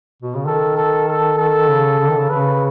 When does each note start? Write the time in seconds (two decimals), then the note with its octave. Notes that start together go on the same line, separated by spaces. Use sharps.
0.22 B2
0.35 C#3
0.46 D#3 A4
0.77 A4
1.08 A4
1.38 A4
1.69 C#3
2.00 C#3
2.10 D#3
2.19 C#3
2.30 C#3 B4